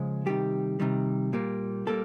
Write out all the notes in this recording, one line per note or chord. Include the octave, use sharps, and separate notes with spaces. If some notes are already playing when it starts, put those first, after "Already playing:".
Already playing: C#3 F3 G#3
C3 D#3 G3 G4
C3 D#3 G3
A#2 G3 A#3
A#2 G3 A#3 A4